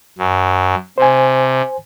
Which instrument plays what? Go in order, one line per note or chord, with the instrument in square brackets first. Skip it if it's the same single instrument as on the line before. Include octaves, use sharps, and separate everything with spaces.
[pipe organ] F#2
[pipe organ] C3 [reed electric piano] C5 G#5